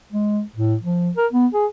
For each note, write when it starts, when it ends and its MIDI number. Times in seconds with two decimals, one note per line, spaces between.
0.12 0.41 56
0.56 0.75 45
0.83 1.10 53
1.17 1.27 70
1.33 1.47 59
1.54 1.66 68